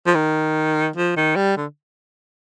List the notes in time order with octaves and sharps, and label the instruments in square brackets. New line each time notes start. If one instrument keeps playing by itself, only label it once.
[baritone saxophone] F3
D#3
F3
D#3
G3
D3